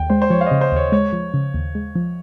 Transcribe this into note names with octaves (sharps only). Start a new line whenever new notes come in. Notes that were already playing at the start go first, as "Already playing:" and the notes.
Already playing: D#2 G5
G#3 C5
C5
F3 C#5
F5
D#5
C#3
C5
D#2 C#5
G#3 C#5
F3
C#3
D#2
G#3
F3